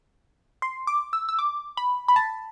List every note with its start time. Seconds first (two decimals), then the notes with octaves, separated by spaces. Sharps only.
0.62 C6
0.87 D6
1.13 E6
1.29 E6
1.39 D6
1.77 B5
2.08 B5
2.16 A5